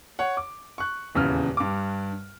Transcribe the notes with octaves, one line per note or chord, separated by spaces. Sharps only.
C#5 F#5
D6
C#6 F#6
D#1 E2 C#3 F6
G2 D6